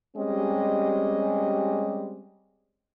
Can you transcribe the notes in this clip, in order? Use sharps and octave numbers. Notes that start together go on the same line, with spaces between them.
G3 G#3 C4 C#4 G4 D#5